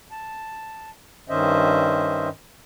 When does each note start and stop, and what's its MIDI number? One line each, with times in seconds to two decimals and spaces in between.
0.11 0.90 81
1.29 2.29 43
1.29 2.29 51
1.29 2.29 61
1.29 2.29 72
1.29 2.29 75
1.29 2.29 76